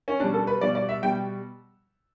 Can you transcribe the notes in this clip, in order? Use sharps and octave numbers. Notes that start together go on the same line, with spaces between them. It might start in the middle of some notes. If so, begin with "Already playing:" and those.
C#4
B2 G3 D4
A4
B4
B2 G3 D5
D5
E5
B2 G3 G5